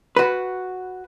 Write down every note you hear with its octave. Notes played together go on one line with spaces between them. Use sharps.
F#4 B4